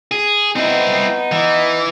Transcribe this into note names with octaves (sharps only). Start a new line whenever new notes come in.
G#4
B3 C4 D#4 E4
E3